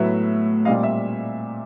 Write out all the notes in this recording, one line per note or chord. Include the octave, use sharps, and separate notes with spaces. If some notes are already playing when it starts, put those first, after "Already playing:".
Already playing: A2 F#3 B3 E5
A#2 G3 C4 D#5 F5
E5